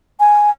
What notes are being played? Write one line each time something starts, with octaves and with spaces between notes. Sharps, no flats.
G#5